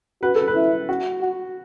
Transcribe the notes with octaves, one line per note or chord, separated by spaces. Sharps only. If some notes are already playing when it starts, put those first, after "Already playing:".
F#4 B4
A4
B4
E4
F#4
F#4